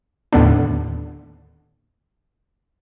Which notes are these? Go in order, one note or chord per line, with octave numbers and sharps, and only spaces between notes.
D#2 A2 D3 B3 D4